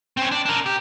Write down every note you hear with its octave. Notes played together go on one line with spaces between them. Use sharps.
C4 C#4
D4
D4 A#4
G4